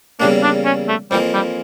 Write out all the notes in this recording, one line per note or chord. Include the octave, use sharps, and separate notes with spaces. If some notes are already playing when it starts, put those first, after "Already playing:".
E2 C#3 G3 A#3 D4
D4
C#4
A3
F2 E3 G3 A#3
G3